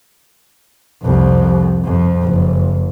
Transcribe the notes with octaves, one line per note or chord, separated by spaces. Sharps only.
C2 F2
F2
F#1